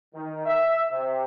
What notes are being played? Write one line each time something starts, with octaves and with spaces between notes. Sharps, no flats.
D#3
E5
C3